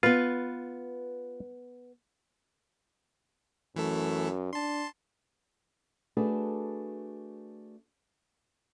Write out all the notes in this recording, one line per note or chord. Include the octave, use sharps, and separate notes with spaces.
B3 F4 B4
F#2 E3 A3 A4
D4 A5 C6
A3 D4 F#4 G#4 A4 B4